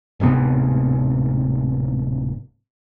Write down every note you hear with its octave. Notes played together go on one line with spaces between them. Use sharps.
D1 G#2 C3 B3